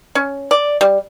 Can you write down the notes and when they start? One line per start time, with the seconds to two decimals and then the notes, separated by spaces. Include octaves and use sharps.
0.15 C#4
0.51 D5
0.81 G3